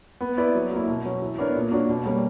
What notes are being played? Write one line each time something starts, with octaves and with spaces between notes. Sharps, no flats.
B3
E4 B4 D5
F#3
A#3 E4
B2
F#3 C#4
E3
B3 D4 A#4 C#5
A#2
A#3 D4 F#4 C#5
B2
G3 A#3 C#4